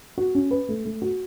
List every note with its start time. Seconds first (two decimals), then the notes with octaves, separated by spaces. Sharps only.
0.18 F#4
0.35 C#4
0.51 B4
0.69 A3
0.85 A3
1.02 F#4